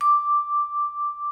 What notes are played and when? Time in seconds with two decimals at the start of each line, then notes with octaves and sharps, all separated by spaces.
0.01 D6